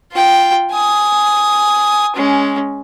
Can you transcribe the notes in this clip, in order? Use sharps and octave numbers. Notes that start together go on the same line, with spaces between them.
F4 G5
G#5 D#6
G#3 C#4